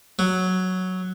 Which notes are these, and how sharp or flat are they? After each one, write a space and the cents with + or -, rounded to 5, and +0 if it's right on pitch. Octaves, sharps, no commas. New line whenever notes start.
F#3 +0